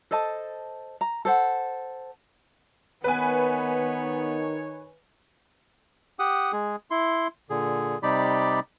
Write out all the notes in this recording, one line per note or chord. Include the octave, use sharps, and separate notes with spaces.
A4 C5 D#5 A5
A#5
A4 C5 F#5
D#3 B3 B4 C#5 G#5
G4 F#5 D#6
G#3 G#4
E4 C6
A#2 D3 G#4
C3 G3 D#4 G4 D5 B5